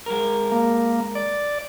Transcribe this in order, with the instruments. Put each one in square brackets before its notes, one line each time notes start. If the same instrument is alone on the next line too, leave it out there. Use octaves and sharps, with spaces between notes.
[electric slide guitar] G#3 A#4
[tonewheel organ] A#3
D5